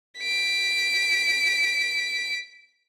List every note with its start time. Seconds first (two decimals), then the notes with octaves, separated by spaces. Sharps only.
0.19 B6 D7